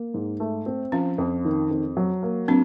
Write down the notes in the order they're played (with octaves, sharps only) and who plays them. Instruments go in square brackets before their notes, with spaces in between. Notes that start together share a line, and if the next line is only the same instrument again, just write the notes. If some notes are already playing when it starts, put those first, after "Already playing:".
Already playing: [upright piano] A#3
G#2
A3
C4
[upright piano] F3 [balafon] C#4
[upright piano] F2
D#3
F2
F#3
A#3
[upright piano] F#3 [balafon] C4 D4